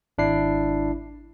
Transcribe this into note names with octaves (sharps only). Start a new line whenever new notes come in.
G#1 D4 E4 C7